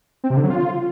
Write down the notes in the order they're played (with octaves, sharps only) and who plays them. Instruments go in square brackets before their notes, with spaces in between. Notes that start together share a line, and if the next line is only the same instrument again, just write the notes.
[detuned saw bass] C4
C3
D3
F#3
F4